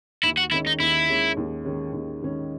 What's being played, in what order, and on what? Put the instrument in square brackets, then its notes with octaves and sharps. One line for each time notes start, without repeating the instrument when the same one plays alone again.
[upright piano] D#2 [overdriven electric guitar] E4
[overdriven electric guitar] F#4
[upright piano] D#3 G#3 C#4 [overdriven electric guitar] E4
[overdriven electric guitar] D#4
[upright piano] D#2 [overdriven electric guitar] E4
[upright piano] D#3 G#3 C#4
D#2
D#3 G#3 C#4
D#2
D#3 G#3 C#4